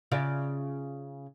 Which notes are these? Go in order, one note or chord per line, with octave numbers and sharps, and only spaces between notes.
C#3 F4 D5